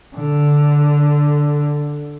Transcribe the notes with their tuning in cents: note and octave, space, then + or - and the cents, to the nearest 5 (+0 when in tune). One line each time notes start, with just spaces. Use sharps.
D3 +0